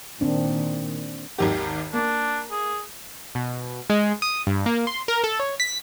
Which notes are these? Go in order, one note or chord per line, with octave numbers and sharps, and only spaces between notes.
A#2 D#3 C4 D4
G#1 D#2 G4
A#3 D4
G#4
B2
G#3
D#6
G2
A#3
C6
A#4
A4
C#5
B6